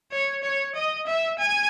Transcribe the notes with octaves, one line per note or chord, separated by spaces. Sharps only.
C#5
C#5
D#5
E5
G#5